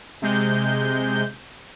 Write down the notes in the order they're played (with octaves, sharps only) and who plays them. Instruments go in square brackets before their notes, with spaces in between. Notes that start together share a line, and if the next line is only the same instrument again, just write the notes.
[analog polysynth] C3 G#3 G6